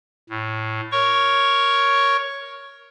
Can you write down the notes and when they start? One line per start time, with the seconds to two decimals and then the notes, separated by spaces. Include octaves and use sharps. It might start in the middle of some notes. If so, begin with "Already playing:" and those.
0.30 A2
0.92 A#4 C#5 C#6